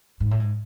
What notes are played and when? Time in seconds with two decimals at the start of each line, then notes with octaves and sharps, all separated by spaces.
0.20 G#2
0.31 A2
0.40 G#2